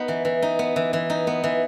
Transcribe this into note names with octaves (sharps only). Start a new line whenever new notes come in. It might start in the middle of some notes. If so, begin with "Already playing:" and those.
Already playing: B3 D#4 B4
E3
E3
D#4
B3
E3
E3
D#4
B3
E3